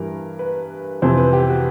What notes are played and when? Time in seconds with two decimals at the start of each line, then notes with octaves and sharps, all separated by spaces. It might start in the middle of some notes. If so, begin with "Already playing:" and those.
Already playing: G2 E3 A#4
0.39 B4
1.02 F2 C3 E3 C5
1.18 B4
1.33 G4
1.49 F#4